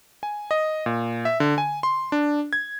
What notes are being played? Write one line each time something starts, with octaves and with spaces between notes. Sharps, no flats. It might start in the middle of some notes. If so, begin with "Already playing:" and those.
G#5
D#5
A#2
E5
D3
G#5
C6
D4
G#6